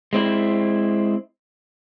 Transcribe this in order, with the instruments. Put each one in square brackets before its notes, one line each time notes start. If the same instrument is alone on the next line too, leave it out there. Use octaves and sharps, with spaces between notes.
[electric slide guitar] G#3 C4 E4